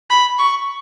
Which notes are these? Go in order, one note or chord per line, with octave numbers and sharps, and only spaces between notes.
B5
C#6